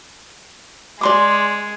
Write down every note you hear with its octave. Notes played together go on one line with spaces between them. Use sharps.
G#3 D5 C6 D6